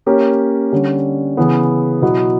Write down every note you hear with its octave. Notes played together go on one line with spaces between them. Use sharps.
A#3 C#4 G4 A#4 C#5
D3 G3 C#4
C#3 E3 B3
B2 F#3 B3 E4